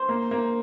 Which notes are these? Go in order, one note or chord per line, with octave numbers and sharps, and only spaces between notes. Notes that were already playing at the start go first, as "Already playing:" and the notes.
Already playing: C5
A#3
A#3